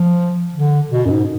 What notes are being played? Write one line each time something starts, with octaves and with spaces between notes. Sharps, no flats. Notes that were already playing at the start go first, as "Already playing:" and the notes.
Already playing: F3
D3
B2
F#2
G#2